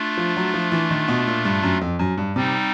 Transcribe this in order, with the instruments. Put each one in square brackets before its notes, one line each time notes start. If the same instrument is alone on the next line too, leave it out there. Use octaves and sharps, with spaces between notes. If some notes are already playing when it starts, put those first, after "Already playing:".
Already playing: [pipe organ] A3 D4 F4
[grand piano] F3
F#3
F3
E3
D#3
B2
A#2
G2
F#2
F2
F#2
G2
[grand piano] C3 [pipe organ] G3 C4 D#4